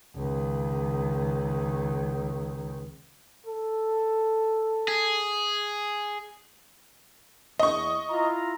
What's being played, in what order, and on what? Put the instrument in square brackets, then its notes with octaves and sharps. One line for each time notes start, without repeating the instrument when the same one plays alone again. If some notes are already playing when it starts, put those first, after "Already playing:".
[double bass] C#2 D#3
[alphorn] A4
[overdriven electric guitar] G#4
[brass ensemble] E2 [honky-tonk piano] D#5 C#6
[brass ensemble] E4 F4 A#5